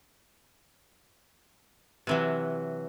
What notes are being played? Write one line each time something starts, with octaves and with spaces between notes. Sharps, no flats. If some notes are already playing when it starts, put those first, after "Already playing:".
C3 E3 F#3